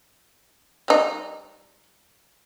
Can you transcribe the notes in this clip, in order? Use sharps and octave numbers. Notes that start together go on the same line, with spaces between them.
G3 D#4